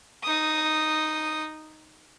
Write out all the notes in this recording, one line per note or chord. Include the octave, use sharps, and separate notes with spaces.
D#4 D#6